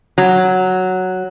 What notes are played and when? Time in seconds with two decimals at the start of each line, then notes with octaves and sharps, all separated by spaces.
0.18 F#3